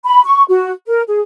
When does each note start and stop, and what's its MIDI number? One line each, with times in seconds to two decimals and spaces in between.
0.05 0.23 83
0.25 0.43 85
0.48 0.71 66
0.86 1.02 70
1.08 1.21 68